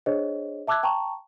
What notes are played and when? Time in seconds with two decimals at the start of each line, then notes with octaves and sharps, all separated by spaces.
0.06 D4 G#4 C5 C#5 D#5
0.67 E5 A5 D6 E6 F#6 G#6
0.83 G5 A5 A#5 C#6